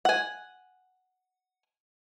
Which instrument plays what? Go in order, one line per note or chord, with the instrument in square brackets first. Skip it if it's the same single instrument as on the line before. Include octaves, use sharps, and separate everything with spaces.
[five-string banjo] F#5 G#5